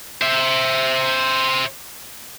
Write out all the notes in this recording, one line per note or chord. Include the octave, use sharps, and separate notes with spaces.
C5 E5